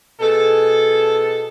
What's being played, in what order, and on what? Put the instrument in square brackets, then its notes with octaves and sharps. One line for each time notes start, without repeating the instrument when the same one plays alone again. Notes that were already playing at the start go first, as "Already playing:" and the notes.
[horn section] B2 G#4 A4